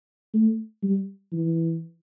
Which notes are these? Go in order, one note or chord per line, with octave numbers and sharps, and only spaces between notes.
A3
G3
E3